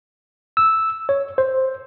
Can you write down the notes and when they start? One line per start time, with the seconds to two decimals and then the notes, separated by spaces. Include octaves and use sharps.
0.57 E6
1.09 C#5
1.38 C5